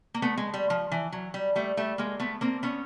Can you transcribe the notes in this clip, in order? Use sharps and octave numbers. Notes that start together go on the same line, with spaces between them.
A#3
A3 B3
G#3
G3
F3
E3
F#3
G3
G3 A3
G3 A3
G#3 A#3
A3 B3
A#3 C4
B3 C#4